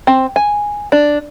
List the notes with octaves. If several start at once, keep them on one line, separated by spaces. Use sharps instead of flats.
C4
G#5
D4